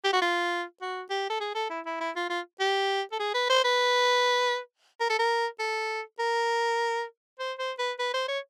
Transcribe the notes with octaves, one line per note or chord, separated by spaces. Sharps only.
G4
F#4
F4
F#4
G4
A4
G#4
A4
E4
E4
E4
F4
F4
G4
A4
G#4
B4
C5
B4
A#4
A4
A#4
A4
A#4
C5
C5
B4
B4
C5
C#5